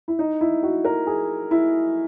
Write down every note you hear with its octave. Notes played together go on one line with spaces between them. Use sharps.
E4
D#4
E4
F#4
A#4
G#4
E4